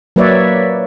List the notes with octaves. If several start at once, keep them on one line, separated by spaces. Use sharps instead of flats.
F#3 A#3 B4 C#5 D5 E5